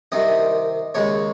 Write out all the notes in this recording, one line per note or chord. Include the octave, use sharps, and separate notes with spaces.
C2 C3 D#3 D#5
D#2 C#3 G#3 C#5